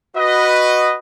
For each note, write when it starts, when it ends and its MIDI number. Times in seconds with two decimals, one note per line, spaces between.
0.17 0.96 66
0.17 0.96 71
0.17 0.96 75